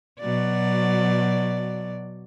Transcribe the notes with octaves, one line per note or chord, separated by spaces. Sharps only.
B2 F#3 D5